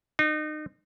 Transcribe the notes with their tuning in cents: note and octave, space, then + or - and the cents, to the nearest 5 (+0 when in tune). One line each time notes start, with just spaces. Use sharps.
D#4 -30